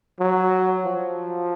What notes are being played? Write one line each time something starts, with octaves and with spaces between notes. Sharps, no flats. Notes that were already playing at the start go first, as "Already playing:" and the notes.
F#3
F3